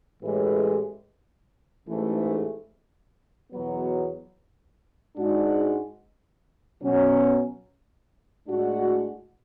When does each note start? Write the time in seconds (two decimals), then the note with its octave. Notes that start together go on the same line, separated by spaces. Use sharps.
0.21 A1 A2 E3 G#3
1.86 A1 G#2 E3 A3
3.51 E2 B2 F#3 B3
5.17 G#2 G#3 D4 F#4
6.82 B2 F#3 C#4
8.47 A2 G#3 D4 F#4